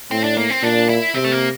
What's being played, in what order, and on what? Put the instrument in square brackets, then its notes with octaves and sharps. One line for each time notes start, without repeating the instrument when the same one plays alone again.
[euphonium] A2 [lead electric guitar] C4
[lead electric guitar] D4
A#3
C4
[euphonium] A#2 [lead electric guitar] D4
[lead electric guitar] E4
[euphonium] C3 [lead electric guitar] C4
[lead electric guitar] A3
A#3